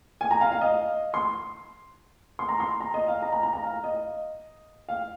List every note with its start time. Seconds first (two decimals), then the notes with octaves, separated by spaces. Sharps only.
0.21 G#5
0.31 A#5
0.41 F5
0.52 F5
0.61 D#5
1.14 C6
2.39 C6
2.49 A#5
2.60 C6
2.80 A#5
2.94 D#5
3.08 F5
3.22 A#5
3.33 A#5
3.43 A#5
3.53 A#5
3.63 F5
3.84 D#5
4.89 F5